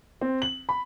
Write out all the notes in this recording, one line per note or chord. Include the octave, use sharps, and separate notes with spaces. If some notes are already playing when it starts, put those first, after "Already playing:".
C4
F#7
B5